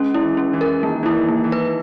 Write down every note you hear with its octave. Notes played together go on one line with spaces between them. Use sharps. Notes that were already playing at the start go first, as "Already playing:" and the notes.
Already playing: G#3 C#4
E4
E3
C#4
E3
A#4
D#3 A#3
E3 E4
D#3
A#3
E3
B4